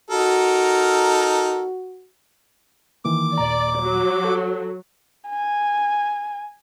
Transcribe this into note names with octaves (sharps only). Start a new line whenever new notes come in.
D#4 F#4 A4 A#4
D#3 E3 A#3 D6
D#2 A#2 D5 A#5
F#3
A4
G#5